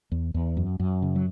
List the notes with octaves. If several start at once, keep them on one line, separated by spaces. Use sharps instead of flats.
E2
E2
F#2
F#2
C#3
F#3